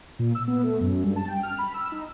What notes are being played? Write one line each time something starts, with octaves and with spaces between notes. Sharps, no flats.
A#2
E6
B3
A3
F#2
G2
A5
G5
F6
B5
E6
D#4